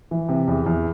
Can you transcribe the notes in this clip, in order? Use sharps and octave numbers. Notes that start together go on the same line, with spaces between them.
E3
C3
E2
E2